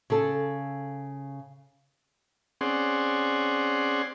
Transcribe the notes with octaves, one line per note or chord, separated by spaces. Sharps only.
C#3 A4
C4 C#4 G#4 D5 F#5 C6